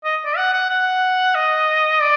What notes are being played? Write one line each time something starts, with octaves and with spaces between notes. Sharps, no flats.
D#5
D5
F#5
F#5
F#5
D#5
D5